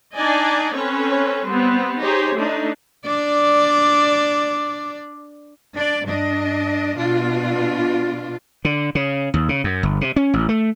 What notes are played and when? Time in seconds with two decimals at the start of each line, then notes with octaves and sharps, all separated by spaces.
0.15 D4 D#4 D5 D#5 G#5
0.74 C4 C#4 A4 B4 C#5
1.45 G3 B3 C4
2.00 D#4 G4 G#4 C5 C#5
2.35 A3 D4 D#4
3.06 D4 D5
5.75 D4 D5
6.04 G2 D4 D#5
6.97 B2 D4 F4
8.65 D3
8.95 C#3
9.34 D#2
9.49 C#3
9.64 F#2
9.83 G1
10.01 C3
10.16 C#4
10.34 A1
10.49 A3